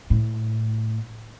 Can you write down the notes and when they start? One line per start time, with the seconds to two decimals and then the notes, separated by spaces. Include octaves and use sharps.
0.10 A2